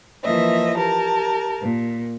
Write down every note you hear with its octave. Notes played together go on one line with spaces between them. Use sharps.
E3 F3 A#3 D#5 E5
G4 A#4 A5
A#2